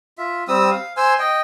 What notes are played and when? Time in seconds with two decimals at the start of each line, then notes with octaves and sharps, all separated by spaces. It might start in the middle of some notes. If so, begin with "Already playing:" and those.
0.18 F4 E5
0.48 G3 C4 D#6 E6
0.71 F5
0.97 C5 G#5 C6 E6
1.19 D#5 G5